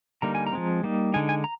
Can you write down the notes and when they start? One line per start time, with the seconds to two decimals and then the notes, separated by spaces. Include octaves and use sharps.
0.22 D3 G3 A#3 D#4 A#5
0.35 G#5
0.47 A#5
0.53 F3 G#3 C4
0.83 G3 A#3 D#4
1.14 D3 G#3 D#4 G#5
1.29 G#5
1.44 A#5